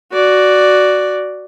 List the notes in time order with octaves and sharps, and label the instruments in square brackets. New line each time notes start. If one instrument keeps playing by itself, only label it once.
[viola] F#4 D5